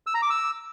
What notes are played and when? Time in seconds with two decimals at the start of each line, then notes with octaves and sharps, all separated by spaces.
0.07 E6
0.14 A#5
0.22 D6
0.30 E6